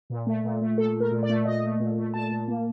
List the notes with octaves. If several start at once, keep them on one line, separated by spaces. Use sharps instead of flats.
A#2
A3
A#2
A3
A#2 A4
A3 A#4
A#2
D5
A3
A#2 D#5
A3
A#2
A3
A#2 A5
A#2
A#3